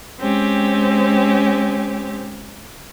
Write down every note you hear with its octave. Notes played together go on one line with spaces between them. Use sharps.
G#3 C4 C#4 G4